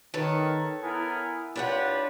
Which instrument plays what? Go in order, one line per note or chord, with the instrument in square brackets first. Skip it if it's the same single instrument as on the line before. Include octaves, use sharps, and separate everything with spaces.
[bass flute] D#3 [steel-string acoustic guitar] A4 B4 C#5
[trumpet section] B3 A#4 G#5 [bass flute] E4
[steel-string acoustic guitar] D4 C#5 F#5 [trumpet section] F4 G4 B4